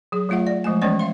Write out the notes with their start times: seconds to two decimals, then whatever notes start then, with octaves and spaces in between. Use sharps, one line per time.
0.12 F#3 G#4
0.29 F#3 A3 F4 E5 F#5
0.47 D5
0.64 F3 G#3 A3 G#5
0.82 E3 G#3 B3 C#4 C#5 D5
0.99 E5 F5 C6